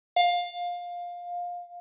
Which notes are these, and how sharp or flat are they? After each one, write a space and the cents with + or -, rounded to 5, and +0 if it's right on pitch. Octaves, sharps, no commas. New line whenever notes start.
F5 +15